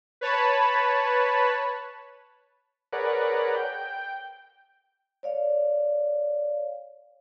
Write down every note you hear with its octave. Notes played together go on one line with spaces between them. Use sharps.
B4 C#5 A5 B5
G#4 A#4 B4 C#5 D5 F#5
G5
C#5 D5 F5